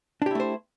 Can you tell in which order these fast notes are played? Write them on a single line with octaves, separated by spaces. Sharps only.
D4 G4 E4 A3 C5